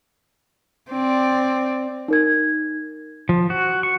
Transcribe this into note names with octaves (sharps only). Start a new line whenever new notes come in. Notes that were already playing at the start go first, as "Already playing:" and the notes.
C4 D5
D#4 A#4 G#6
F3
F#4
C#6